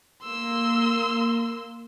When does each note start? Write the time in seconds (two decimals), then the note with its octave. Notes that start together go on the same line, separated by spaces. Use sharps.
0.24 A#3 C6 E6